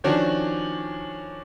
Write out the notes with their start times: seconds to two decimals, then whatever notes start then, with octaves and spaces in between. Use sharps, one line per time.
0.04 D#3 F3 C#4 D4 F#4